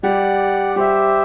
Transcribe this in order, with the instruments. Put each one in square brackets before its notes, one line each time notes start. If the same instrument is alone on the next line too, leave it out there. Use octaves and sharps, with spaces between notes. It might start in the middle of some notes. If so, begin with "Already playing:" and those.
[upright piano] G3 [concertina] G4 D5 F#5
[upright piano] G3 [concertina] G4 C5 E5